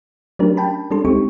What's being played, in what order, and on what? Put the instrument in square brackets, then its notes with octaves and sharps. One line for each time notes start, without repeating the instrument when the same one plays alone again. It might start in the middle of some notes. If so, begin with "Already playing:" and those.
[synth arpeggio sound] F#3 A3 C#4 D4 G4 A#4
G5 A5 B5
G3 C#4 D4 A4 C6
D2 G#3 C4 D#4 G4 C#6